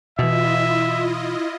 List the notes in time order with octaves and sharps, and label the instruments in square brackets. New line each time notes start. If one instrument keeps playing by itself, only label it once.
[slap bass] B2 E3 [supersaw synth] E4 F4 D#5 [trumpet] E5